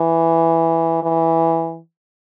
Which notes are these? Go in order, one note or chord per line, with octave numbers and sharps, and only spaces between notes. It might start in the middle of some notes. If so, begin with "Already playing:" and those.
Already playing: E3
E3